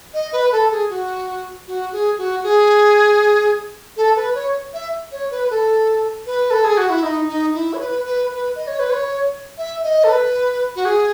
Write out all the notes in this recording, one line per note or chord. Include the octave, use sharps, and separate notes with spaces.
D#5
B4
A4
G#4
F#4
F#4
G#4
F#4
G#4
A4
B4
C#5
E5
C#5
B4
A4
B4
A4
G#4
F#4
E4
D#4
D#4
E4
C#5
B4
B4
B4
D#5
C#5
B4
C#5
E5
D#5
A4
B4
F#4
G#4